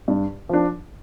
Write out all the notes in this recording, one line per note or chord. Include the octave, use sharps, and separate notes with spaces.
G2
F3 D4